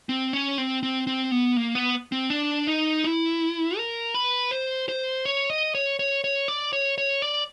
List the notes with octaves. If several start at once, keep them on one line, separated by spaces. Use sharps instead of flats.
C4
C#4
C4
C4
C4
B3
A#3
B3
C4
D4
D#4
E4
A#4
B4
C5
C5
C#5
D#5
C#5
C#5
C#5
D5
C#5
C#5
D5